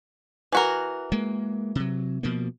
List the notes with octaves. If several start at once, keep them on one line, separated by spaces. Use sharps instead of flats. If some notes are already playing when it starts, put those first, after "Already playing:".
E3 F#4 A#4
G#3 A#3
C3 F#3
B2 F3 A#3